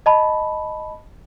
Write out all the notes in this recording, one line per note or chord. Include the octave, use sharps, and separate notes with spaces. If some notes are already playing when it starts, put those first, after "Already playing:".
D#5 A5 B5